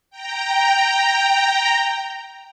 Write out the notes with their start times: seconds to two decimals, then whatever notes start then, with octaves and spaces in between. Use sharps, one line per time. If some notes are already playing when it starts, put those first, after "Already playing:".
0.10 G5 A#5